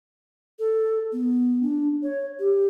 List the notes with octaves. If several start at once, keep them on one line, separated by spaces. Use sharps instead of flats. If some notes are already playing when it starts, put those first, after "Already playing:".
A4
B3
D4
C#5
G4